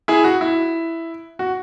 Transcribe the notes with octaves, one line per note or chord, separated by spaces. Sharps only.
E4 G#4
F#4
E4
F#4